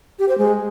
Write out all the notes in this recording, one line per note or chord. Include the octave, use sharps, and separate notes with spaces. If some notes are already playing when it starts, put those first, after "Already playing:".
G4
C5
G#3